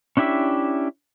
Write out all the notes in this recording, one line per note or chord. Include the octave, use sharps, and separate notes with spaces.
C#4 D4 E4 G4 E5